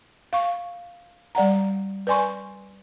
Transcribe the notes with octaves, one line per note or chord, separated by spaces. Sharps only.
F5 C#6
G3 D5 F#5 A#5
B4 D5 G#5 C6 C#6